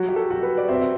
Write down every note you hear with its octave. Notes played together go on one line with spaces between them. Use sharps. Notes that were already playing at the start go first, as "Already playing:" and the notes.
Already playing: F#3 F#4
G4
A4
F#4
B4
D5
C4 E5